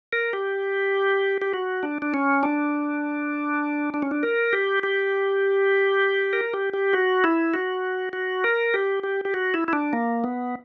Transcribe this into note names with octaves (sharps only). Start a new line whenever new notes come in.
A#4
G4
G4
F#4
D4
D4
C#4
D4
D4
C#4
D4
A#4
G4
G4
A#4
G4
G4
F#4
E4
F#4
F#4
A#4
G4
G4
G4
F#4
E4
E4
D4
A#3
B3